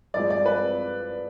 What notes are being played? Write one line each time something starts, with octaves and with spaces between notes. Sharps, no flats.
G2 F3 G#3 D5
D5
B4